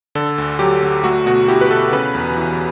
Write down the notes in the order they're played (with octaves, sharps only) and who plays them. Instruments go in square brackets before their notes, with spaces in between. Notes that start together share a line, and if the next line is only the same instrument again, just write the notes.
[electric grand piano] D3 A4
D2
F#3 G4
D2
A3 F#4
B2 F#4
E4 G4
B4
B2 A4
C#3 B4
E2
E3